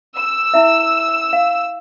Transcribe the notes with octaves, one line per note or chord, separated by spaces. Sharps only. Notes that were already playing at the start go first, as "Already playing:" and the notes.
E6
E4 E5
F5